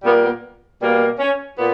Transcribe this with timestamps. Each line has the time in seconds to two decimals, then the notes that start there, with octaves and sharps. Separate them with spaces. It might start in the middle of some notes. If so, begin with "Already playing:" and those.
0.03 A#2 G3 A#3 B3
0.23 B3
0.81 B2 G3 A#3
1.19 C#4
1.57 A#2 B3